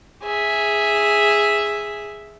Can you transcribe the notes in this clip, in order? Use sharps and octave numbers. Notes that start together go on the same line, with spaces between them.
G#4 E5